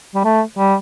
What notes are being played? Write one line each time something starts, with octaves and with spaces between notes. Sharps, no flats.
G3
A3
G3